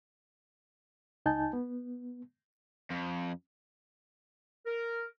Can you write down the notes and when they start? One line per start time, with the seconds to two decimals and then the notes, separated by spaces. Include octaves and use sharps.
1.26 C#2 D#4 G#5 A5 G6
1.53 B3
2.91 F2
4.66 A#4